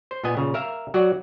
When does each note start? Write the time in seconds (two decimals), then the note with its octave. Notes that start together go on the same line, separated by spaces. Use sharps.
0.11 C5
0.24 A#2 B3 D#5 G#5
0.37 A#2 C#3
0.54 A#4 E5 F5
0.94 F#3 F#4 D5